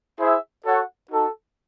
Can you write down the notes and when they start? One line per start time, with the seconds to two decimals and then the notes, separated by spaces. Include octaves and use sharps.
0.19 E4 G#4 C5 E5
0.65 F#4 A4 C#5 F#5
1.10 D#4 F#4 A4